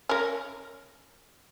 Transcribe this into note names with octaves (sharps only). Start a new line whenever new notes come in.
C#4 A#4